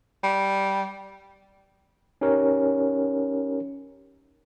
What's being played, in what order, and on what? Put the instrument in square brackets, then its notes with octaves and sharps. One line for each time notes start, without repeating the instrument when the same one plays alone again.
[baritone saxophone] G3
[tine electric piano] C#4 D#4 G4 A#4 C#5